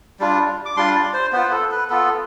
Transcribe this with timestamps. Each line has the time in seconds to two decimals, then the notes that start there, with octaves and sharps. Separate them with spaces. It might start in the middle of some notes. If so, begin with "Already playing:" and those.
0.20 G3 D4 F4
0.65 D6
0.76 G3 D4 F4 C6
0.95 D5
1.13 C5
1.32 B3 F4 C5
1.45 B4
1.51 A4
1.71 B4
1.90 B3 F4 A4